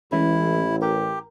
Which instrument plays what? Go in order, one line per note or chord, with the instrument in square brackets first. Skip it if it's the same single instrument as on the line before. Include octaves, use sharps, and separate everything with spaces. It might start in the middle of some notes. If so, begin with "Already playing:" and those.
[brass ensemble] A1 [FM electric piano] E3 G#3 C#4 [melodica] E4
[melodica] G4 [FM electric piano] A#4